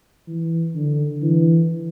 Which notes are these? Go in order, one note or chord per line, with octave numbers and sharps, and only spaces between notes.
E3
D3
E3